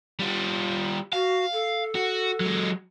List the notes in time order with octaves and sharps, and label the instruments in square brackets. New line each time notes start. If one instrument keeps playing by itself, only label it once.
[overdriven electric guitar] G3 F4
[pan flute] F#4 [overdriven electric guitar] F5
[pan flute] A4
[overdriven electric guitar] F#4
F#3 G#3